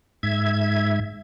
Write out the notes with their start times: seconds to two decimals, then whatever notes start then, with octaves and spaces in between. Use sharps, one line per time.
0.23 G#2 E5 G#6